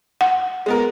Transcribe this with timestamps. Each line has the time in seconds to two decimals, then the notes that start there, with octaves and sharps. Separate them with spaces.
0.21 F#5
0.66 G#3 B3 A#4